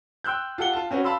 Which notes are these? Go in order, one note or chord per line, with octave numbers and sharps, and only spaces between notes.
G5 C6 E6 F#6 G6
F4 G4 A4 F#5 G7
F4 A5
C4 C#4 F#4 B4
F5 A5 B5 C6 E6